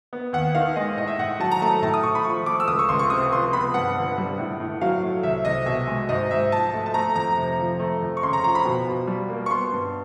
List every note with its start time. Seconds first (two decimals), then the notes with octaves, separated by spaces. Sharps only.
0.13 B3
0.33 D#2 F#5
0.55 D#3 F5
0.76 G#3 D#5
0.97 A2 D#5
1.07 E5
1.19 A2 F#5
1.40 F#3 A5
1.51 A#5
1.62 A3 A5
1.82 A2 A5
1.94 D#6
2.03 A2 C#6
2.15 B5
2.25 F3 C#6
2.46 A3 D6
2.60 E6
2.67 C#2 D#6
2.79 C#6
2.89 C#2 C6
2.99 C#6
3.10 C3 D#6
3.32 F3 C6
3.53 B3 B5
3.74 G2 F#5
3.96 D3
4.18 G3
4.39 A2
4.60 A2
4.81 F#3 F5
5.03 A3
5.23 C2 E5
5.45 C2 D#5
5.66 B2 E5
5.87 G#3
6.09 G#2 D#5
6.31 G#2 E5
6.52 F3 A5
6.74 A3
6.86 A5
6.94 A3 A#5
7.15 F2 A#5
7.37 C3
7.59 F3
7.80 A3
8.01 F2
8.17 C#6
8.23 C#3 C6
8.33 A#5
8.44 F3 A#5
8.55 B5
8.65 B2
8.87 B2
9.07 G3
9.29 A#3
9.46 C#6
9.51 B3 C6
9.72 G2